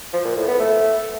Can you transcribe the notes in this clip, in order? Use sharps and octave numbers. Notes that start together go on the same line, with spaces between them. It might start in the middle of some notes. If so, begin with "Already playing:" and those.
F3
A#2
A2
B3
A3